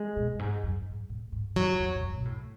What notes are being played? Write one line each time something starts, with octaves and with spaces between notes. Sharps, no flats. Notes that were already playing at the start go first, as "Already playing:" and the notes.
Already playing: G#3
B2
F#2
G#2
F#2
G#2
A2
G#2
F#2 F#3
F2
G#2
F#2
B2
A2